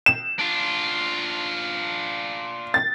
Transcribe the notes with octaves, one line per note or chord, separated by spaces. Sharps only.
E7
D4 F4
A6